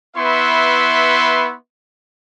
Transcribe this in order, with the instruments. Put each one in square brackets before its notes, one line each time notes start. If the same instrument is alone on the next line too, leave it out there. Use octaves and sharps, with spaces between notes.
[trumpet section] B3 E4 B4 E5 C6 C#6